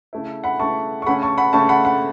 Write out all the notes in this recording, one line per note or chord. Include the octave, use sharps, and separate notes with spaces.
C#3 A3 E4
F#5 B5
C#3 A3 E4 A5 C#6
C#6
C#3 A3 C#4 F#5 B5
A5 C#6
F#5 B5
C#3 A3 C#4 A5 C#6
F#5 B5
F#5 B5